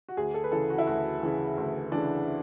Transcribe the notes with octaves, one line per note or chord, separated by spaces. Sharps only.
F#4
D2 G#4
A4
B4
C#3 E3 A4
F#4
E4
D2 F#4
C#3 E3
D2
C#3 E3 D4